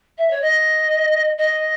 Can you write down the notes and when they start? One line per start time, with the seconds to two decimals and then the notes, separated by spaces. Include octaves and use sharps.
0.18 E5
0.31 C#5
0.42 D#5
1.38 D#5